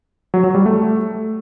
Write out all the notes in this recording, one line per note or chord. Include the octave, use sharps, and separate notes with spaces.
F#3
F#3
G3
A3